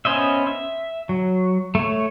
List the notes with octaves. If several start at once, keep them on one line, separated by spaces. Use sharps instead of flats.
B3 C#4 C5 D#5 E5
E5
F#3
A3 C#5